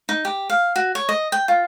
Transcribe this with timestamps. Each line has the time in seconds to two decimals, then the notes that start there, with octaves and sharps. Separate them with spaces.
0.09 D#4
0.25 G4
0.50 F5
0.76 F#4
0.95 C#5
1.09 D#5
1.32 G5
1.48 F4